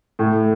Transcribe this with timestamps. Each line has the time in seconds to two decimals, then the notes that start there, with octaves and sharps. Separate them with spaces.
0.19 A2